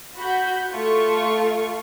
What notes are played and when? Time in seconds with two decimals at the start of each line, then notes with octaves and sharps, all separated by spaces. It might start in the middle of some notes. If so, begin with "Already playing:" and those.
0.18 F#4 B5 G6
0.72 A3 F4 C#6